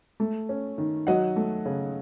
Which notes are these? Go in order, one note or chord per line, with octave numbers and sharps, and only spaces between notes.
A3
C#4
D#3
F#3 D#5 F#5
A3
C#3